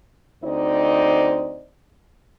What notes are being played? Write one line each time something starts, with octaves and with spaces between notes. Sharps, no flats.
D2 C4 D#4 C5 D5 D#5